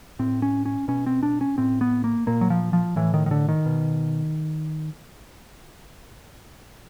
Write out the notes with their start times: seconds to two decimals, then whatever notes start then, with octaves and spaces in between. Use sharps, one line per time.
0.19 A2 C4
0.42 C#4
0.66 C#4
0.88 B2 C#4
1.06 C4
1.23 D4
1.41 C#4
1.58 A2 C4
1.81 B3
2.04 A#3
2.27 A#2 A#3
2.41 F#3
2.50 F3
2.73 F3
2.96 A2 E3
3.14 D#3
3.26 D#3
3.31 D3
3.49 D#3
3.66 B2